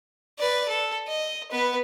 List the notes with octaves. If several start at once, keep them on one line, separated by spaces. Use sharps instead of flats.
B4 D5
A4
D#5
B3 B4